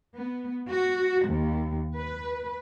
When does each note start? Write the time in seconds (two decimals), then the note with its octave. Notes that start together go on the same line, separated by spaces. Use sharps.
0.16 B3
0.69 F#4
1.27 D#2
1.95 B4